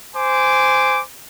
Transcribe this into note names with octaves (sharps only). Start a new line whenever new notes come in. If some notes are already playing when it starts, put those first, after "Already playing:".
C5 G#5 D6